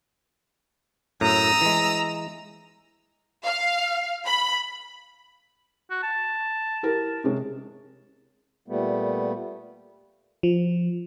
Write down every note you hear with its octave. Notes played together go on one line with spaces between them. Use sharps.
F#2 A2 A#5 D#6 E6
E3 G#3
F5
B5
F#4
A5
E4 G4 A#4
C3 G#3 C#4
A#2 G3 A3 B3
F3